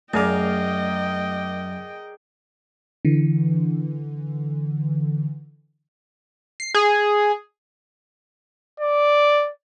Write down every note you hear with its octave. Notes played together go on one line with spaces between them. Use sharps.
F#2 A3 G#4 A#4 D5 D#5 F5 G5
D3 E3
C7
G#4
D5